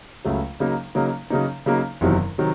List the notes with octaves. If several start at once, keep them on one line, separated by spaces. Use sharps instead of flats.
C#2 C#3 F#3 A3
C#3 F#3 A#3 D#4
C#3 F#3 A#3 D#4
C#3 F#3 A#3 D#4
C#3 F#3 A#3 D#4
F#1 E2 C3 D#3 F#3
C3 D#3 F#3